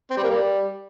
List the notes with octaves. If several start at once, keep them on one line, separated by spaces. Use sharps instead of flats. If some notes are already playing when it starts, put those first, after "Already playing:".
C4
G3
A#3
G3